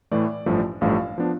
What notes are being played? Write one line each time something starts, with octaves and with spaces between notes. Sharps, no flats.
A2 E3 A3 D5
A1 G2 F3 A3
A1 G2 F3 A3 F5
F3 B3 D4